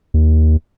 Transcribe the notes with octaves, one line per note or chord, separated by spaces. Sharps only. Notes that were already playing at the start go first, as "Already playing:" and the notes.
D#2